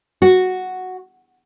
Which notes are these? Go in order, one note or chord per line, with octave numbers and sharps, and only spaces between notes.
F#4